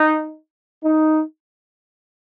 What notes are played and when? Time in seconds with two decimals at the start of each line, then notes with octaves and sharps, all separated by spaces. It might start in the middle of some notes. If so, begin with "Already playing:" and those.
Already playing: D#4
0.84 D#4